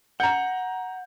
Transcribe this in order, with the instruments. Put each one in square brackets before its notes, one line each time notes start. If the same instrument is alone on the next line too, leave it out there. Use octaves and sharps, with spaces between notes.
[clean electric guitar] F#5 [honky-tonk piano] A#5 G6